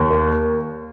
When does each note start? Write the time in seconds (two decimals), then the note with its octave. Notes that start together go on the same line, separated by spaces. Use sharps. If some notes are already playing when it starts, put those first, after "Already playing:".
Already playing: D#2
0.10 A#3